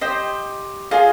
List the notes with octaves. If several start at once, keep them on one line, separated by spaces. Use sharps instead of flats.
G4 C5 D#5
F4 G#4 D#5 G#5